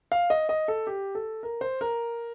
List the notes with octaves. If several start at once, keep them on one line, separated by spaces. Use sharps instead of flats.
F5
D#5
D#5
A4
G4
A4
A#4
C5
A#4